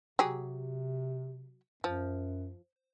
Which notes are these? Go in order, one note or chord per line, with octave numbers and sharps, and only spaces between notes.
C3 F#3 G4 G#4
F#2 F3